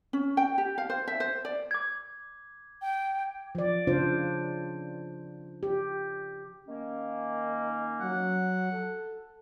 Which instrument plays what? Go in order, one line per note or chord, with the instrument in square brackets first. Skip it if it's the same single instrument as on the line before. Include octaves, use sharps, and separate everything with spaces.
[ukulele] C#4
G5
G4
F5
C5
E5
C5
D5
[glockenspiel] D6 G#6
[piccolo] G5
[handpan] F3 D5
C#3 D4 F4 C5
G4
[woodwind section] D#3 A#3 C#4
[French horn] F#3 [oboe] F#5
[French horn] A4